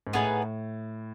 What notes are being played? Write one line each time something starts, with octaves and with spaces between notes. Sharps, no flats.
G#2
A2 B3 D#4 G#4 B4